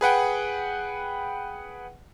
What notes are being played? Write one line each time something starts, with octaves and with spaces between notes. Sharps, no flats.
G#4 B4 F#5 G5